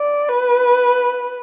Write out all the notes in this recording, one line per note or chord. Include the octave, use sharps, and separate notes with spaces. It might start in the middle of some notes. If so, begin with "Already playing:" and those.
Already playing: D5
B4